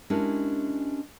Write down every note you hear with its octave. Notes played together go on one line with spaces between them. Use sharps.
G#3 C#4 D4 E4 G4 A#4